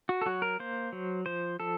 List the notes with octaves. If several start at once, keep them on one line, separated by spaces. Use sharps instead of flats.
F#4
A4
F#3 F#4
A#4
A#3 C5
F#3
F3 C5
F3 A4